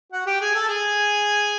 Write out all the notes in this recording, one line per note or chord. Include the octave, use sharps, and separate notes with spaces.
F#4 F#5
G4 G5
G#4 G#5
A4 A5
G#4 G#5